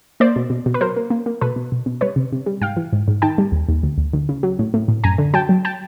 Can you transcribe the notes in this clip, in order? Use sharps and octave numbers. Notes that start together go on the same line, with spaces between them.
A#3 C5 D5
B2
B2
B2
B4
F#3 A#4 C5
A#3
A#3
A#3
B2 A4 B4
B2
B2
B2
G3 B4 C#5
C3
C3
G3
G#2 F5 G5
E3
G#2
G#2
D#3 G5 A5
G3
D#2
D#2
D2
D2
D2
C#3
F#3
A2
A2
A2
F#2 G#5 A#5
D3
F#3 G5 A5
F#3
G5 A5